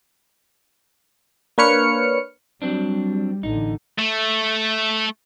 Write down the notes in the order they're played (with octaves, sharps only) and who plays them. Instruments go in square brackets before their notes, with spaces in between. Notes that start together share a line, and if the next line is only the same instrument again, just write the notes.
[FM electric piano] A#3 D4 B4 C#5 F6 C#7
[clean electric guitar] F#3 C4 D4 [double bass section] G3
[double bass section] A1 D3 [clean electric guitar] D#4
[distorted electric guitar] A3